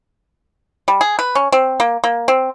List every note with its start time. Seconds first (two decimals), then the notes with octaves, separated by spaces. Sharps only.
0.88 G3
1.01 G#4
1.19 B4
1.35 C#4
1.52 C4
1.80 A#3
2.04 A#3
2.28 C4